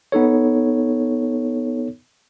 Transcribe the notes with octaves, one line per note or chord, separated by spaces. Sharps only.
B3 D#4 A4 C#5